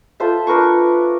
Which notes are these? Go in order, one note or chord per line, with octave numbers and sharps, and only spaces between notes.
F4 A4 C5 E5
D4 A#4 B4 C#6